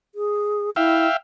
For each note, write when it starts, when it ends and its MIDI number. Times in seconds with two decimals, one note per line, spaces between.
0.15 0.70 68
0.76 1.07 64
0.76 1.17 76
0.76 1.17 77
0.76 1.17 79